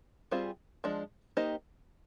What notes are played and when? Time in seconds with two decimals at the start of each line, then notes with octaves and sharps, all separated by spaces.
0.31 G3 C4 F4 G#4 C5
0.84 F3 G#3 D4
1.37 A#3 D#4 G4 C5 D#5